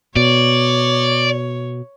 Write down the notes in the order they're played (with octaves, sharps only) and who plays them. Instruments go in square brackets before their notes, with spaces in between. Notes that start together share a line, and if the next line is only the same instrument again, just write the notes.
[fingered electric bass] B2 [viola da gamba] C#5 [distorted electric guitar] D5